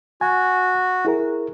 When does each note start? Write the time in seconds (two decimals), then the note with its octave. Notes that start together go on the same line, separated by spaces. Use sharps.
0.21 F#4 G#5
1.05 E4 G#4 A#4